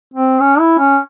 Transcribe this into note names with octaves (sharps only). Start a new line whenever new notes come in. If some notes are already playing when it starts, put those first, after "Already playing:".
C4
C#4
E4
C#4